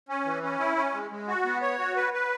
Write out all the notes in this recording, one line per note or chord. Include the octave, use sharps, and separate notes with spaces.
C#4
E3
C#4
E4
C#4
G#3
G#3
F#4
B3
C#5
F#4
B4
B4